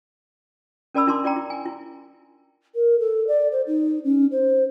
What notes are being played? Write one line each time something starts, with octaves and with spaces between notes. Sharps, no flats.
C#4 A#4 D5 A5 B5 E6
D4 E4 A#4 A5 C6 D6
E4 D5 G5 A#5
E4
G#5
E4
A#4
A4
D5
C5
D#4
C#4
C5